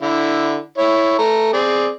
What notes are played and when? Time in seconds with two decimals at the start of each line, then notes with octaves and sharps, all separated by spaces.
0.02 D3 E4
0.78 E4 C#5
1.19 A3 A#5
1.53 C4 G#4 D5